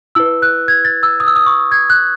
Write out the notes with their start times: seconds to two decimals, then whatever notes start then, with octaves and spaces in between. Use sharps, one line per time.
0.15 E4 B4 E6
0.42 F#6
0.68 G#6
0.85 A6
1.03 E6
1.20 D#6
1.27 E6
1.36 D#6
1.46 C#6
1.72 G#6
1.90 F#6